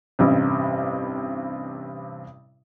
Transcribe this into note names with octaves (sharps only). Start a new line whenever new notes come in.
A1 G2 C3